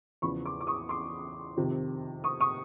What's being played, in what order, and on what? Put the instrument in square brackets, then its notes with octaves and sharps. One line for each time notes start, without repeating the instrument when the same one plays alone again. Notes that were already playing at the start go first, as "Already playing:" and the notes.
[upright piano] E2 C#3 F3 B5 C#6
C6 D6
D6
C#6 D#6
C6 D6
F2 C3 D#3
C#6 D#6
C#6 D#6